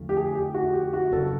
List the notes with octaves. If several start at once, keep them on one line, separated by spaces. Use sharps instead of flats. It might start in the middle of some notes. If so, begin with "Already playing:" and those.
Already playing: F2 D3 F3 A3
G4
G#4
G4
F#4
G4
F#4
G1 F#2 C#3 F#3 A4